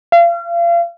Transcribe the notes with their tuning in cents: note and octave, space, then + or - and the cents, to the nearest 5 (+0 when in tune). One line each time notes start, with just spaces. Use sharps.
F5 -35